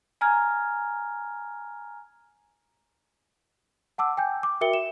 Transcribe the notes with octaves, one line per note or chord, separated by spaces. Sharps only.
G#5 A#5 F6 G#6
F#5 A5 D6 E6
G5 G#5 G6
D6
F#4 A#4 E5 G5 C#7 G7
E7